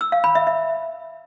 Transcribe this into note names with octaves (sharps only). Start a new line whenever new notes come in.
E6
F5
B5
E5
E5